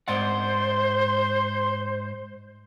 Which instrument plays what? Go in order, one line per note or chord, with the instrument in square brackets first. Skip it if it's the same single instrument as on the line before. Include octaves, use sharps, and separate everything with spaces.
[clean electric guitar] G#2 D5 F#5 [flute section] C5 [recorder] C6